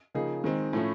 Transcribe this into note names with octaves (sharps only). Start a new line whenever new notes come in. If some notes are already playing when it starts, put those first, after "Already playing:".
C#3 F3 A#3 D#4 G#4
D#3 G#3 C4
A2 F3 A3 C#4 E4